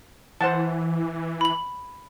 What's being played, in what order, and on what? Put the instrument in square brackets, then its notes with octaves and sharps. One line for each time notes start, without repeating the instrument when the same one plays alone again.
[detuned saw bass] E3 [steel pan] C5 F#5 A5
[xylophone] B5 F#7